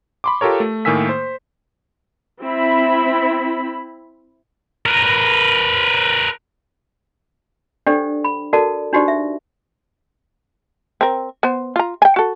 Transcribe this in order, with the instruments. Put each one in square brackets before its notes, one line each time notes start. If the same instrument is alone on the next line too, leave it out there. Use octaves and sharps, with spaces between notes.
[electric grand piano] B5 C6 D6
F4 G4 A4 A#4 C#5
A3
A2 D#3 A#3 G#5 E6 B6
C5
[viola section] C4 E4 E5 B5
[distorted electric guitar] A#4 B4
[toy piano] D4 G4 A4 C5 D5 G5
B5
F#4 A4 A#4 D5 A5
D4 D#4 F#4 G4 C5 D5
E5
[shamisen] C4 A#4
B3 C5
F4 A#5
G5 G#5
F#4 A4